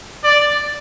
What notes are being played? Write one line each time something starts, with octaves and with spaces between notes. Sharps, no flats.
D5